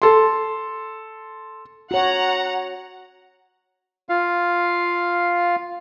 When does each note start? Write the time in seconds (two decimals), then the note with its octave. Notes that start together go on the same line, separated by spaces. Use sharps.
0.02 A4 C6
1.91 F#4 C#5 F#5 A#5
4.09 F4 F5